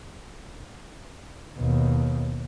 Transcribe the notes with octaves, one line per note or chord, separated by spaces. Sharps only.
D#2 B2